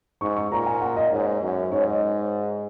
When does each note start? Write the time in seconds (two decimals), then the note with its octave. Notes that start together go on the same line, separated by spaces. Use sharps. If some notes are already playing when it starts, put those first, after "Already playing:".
0.21 G#2 C#6
0.36 C#6
0.52 A#2 A#5
0.66 G#5
0.81 F#5
0.96 D#5
1.11 G#2 C#5
1.26 C#5
1.42 F#2
1.72 G#2 C#5
1.88 D#5